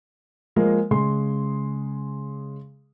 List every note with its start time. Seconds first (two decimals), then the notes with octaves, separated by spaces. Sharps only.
0.56 F3 G#3 A#3
0.91 C#3 G#3 G#4 C6